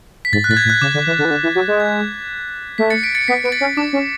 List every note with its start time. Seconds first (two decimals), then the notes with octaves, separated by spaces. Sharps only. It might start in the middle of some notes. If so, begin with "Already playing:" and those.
0.25 B6
0.32 G#2 A6
0.44 F#6
0.49 A2 A6
0.57 G#6
0.65 A2
0.70 F#6
0.81 C#3 D6
0.94 D3
1.07 E3
1.18 D3
1.25 E3
1.31 D3
1.43 E3
1.55 F#3
1.68 G#3
1.80 G#6
2.78 A3 B6
2.90 A6 C#7
3.03 B6 D7
3.15 A6 C#7
3.28 B3 B6
3.44 B3 D7
3.52 A6 C#7
3.61 C#4
3.77 D4 D6
3.93 C#4